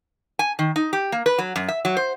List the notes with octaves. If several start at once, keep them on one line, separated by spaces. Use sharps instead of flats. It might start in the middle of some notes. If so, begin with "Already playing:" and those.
G#5
D#3
D#4
G4
A#3
B4
F#3
F#2
E5
F#3
C5